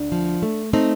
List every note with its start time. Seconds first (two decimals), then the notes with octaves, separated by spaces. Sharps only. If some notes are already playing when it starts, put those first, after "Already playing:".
Already playing: D2 D4
0.12 F3
0.42 A3
0.73 A3 C4 D#4